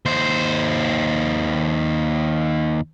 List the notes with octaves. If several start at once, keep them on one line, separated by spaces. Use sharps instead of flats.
D#2 C5